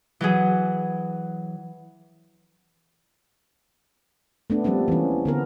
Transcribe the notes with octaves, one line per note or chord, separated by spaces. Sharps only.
E3 F#3 G#4
A3 B3 D4
F3 G3 A#3 C4 D4
E3 C#4
D3 B3 A#4